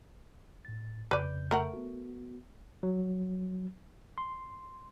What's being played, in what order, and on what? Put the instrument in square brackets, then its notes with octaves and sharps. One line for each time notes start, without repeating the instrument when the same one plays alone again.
[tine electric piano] A2 A6
[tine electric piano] F2 C#3 G6 [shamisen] B4 D5
[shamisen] A3 A#4 F#5
[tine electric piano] B3 F#4
F#3
C6